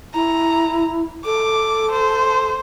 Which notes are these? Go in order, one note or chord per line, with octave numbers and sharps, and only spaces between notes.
E4 A#5
A4 D6
C5